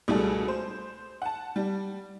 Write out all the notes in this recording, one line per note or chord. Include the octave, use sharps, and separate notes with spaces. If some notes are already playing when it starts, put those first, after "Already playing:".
C#2 B2 G3 A3 G#4 A4
C5
F#5 A5
G3